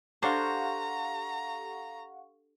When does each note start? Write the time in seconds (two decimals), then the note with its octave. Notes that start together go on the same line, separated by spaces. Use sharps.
0.23 D4 G4 A4 C5 F5 F#5 A#5 C#6